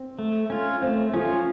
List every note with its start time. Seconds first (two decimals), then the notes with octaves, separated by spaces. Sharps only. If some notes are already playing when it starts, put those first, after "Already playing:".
Already playing: C4
0.19 A3
0.50 C#4 F4
0.82 A3 C4
1.14 F3 C#4 F4